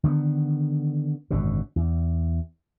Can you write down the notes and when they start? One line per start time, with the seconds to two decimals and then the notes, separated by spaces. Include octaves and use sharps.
0.04 D3 D#3 G3 B3
1.31 G#1 F#2 B2 D3
1.76 E2